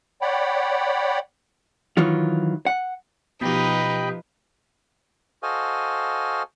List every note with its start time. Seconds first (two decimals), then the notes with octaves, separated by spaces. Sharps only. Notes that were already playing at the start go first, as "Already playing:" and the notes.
0.22 C#5 D5 F#5 G5 B5
1.97 D#3 E3 F#3 F4
2.66 F#5
3.41 B2 F3 D#4 G4 B4 D#5 G5 B5
5.43 F#4 A4 C5 D#5 F5 G#5